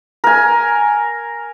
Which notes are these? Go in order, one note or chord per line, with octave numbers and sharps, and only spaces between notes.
A#4 G#5